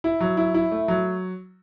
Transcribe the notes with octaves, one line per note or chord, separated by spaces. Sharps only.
E4
F#3
E4
E4
A3
F#3